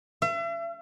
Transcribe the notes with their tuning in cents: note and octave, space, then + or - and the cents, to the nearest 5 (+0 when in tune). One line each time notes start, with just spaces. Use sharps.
E5 +40